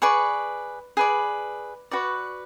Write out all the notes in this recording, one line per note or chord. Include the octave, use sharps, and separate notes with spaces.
G#4 B4 D5 C#6
G#4 B4 D5
F#4 B4 D5 C#6